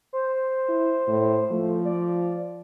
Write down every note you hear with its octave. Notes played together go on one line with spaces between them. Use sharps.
C5
E4
A2
F3 A3
D5